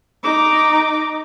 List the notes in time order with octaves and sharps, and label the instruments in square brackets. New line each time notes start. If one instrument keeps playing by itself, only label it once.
[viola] D#4 D6